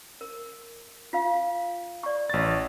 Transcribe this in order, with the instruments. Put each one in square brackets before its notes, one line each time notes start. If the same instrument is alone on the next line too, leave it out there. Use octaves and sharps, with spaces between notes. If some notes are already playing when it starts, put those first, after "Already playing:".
[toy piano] A#4
F4 F5
D5 C#6
[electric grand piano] A1 A6